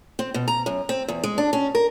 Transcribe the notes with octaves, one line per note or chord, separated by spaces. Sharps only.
C4
B2
A#5
F#2
C4
E2
G#3
D4
C#4
A#4